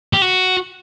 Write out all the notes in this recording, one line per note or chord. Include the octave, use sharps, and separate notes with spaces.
G4
F#4